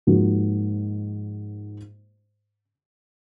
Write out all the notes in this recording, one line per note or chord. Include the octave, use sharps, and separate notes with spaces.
G#2 F3 A#3 D#4 F#4